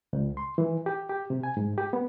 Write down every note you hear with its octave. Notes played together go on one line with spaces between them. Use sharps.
C#2
C6
E3
G4
G4
C3
G#5
G#2
G4
B3